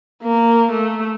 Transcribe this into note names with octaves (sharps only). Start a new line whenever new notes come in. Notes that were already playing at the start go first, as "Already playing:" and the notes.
A#3
A3